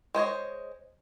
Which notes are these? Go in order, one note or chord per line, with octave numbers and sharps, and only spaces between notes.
G#3 C5 C#5 D#5